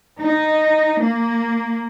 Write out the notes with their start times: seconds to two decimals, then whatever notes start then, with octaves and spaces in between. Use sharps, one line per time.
0.20 D#4
1.02 A#3